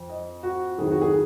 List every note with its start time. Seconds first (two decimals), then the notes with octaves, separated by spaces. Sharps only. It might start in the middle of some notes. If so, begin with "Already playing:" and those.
Already playing: F2 F3
0.09 D#5
0.43 F#4
0.78 F2 D#3 F#3 G#4
0.91 F#4
1.02 G#4